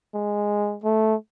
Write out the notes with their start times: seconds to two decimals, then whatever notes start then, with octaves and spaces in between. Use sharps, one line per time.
0.14 G#3
0.83 A3